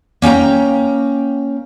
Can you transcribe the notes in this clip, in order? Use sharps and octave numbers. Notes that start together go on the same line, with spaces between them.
A#3 C#4 G5 A#5